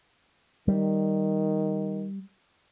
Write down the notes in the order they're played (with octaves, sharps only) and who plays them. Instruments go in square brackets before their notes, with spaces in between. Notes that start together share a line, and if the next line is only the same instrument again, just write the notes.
[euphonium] D#3 [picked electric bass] G3